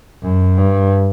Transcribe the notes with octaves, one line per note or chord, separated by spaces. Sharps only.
F#2
G2